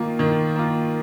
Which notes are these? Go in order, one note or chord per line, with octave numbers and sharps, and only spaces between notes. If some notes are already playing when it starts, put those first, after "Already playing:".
Already playing: D#3 A#3 F4
D#3
A#3 F4